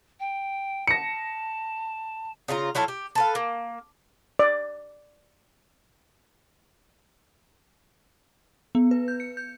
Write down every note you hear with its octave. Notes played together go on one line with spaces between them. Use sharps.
G5
A5 A#6 C#7
C#3 D4 F4 A#5
F#3 E4 F4 A4
G4
A4 B4 F5
A#3
D5
B3
B4
G6
C#7
G6